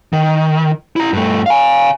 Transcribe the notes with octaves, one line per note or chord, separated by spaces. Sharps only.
D#3
E4 A#5
G2 A3
F5 G#5